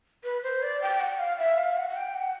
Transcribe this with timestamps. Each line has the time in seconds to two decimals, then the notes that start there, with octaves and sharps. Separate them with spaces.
0.24 B4
0.43 C5
0.63 D5
0.82 G5
1.01 F#5
1.19 F5
1.38 E5
1.58 F5
1.77 F#5
1.89 F#5
1.96 G5
2.15 F#5